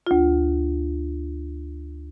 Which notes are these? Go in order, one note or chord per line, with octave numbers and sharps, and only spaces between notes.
D2 F4